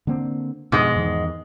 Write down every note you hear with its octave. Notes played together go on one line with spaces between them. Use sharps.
D3 A#3 C4
F2 G#2 B2 G#3
E2 D#3